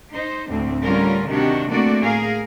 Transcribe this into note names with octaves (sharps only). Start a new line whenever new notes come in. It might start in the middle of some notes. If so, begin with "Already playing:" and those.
D#4 C5
D2 A2 D3 C4
D3 G3 C#4 F4 A#4
C3 D#3 D4 F#4 G4
A3 A#3 C4 D4 F#4 D5
A2 G#4 A#4 F5